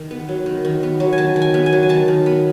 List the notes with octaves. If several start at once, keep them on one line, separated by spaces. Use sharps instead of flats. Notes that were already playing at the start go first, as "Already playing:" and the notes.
Already playing: D#3
B3
F#3
D#3
D#3
B3
F#3
G#5
D#3 A5
D#3
G#5
B3
G#5
F#3
G#5
D#3 A5
D#3
B3 B5